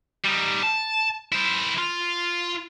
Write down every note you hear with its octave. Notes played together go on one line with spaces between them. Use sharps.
G3 D#4
A5
E4 C5
F4